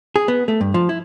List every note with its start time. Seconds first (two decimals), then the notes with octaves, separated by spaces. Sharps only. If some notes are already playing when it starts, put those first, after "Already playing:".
0.16 G#4
0.28 B3
0.48 A3
0.61 G2
0.74 F3
0.89 E4